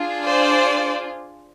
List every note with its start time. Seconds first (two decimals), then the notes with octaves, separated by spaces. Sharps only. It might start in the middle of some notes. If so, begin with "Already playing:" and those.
Already playing: D4 F4 G#4
0.24 C5 D5